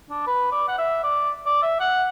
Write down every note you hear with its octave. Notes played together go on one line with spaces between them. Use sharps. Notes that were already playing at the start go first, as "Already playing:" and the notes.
D4
B4
D5
F#5
E5
D5
D5
E5
F#5